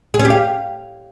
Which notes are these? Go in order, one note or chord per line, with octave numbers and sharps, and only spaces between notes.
G#4
C#4
G4
F5